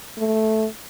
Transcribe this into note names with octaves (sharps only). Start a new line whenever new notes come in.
A3